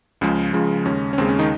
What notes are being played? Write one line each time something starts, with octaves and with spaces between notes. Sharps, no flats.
C#2 C#3 F3 G#3
C#2 C#3 F3 G#3
D#2 C#3 G#3 C#4
C#4
D#2 C#3 G#3 C4
C#4
D#3 D#4